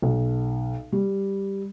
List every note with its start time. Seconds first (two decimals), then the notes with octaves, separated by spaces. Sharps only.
0.02 B1
0.92 G3